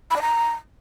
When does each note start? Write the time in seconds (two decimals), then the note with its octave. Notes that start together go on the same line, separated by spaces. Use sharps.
0.11 B5
0.16 D5
0.22 A#5